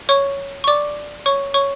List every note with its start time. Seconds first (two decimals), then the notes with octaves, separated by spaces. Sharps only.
0.09 C#5 C#6
0.64 C#6
0.68 D5 D6
1.26 C#5 C#6
1.54 C#5 C#6